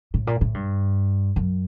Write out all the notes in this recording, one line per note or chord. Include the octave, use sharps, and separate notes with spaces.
A2
A#2
A2
G2
F#2